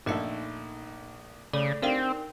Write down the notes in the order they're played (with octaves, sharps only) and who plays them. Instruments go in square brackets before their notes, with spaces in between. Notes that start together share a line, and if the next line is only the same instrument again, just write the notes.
[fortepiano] A#1 A3 A4 [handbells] D#4 D#5 C#7
[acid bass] C#3 [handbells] A3 A4 D5
[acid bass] C4 [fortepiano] D4 G4 F5 [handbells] D#4 A#4 G5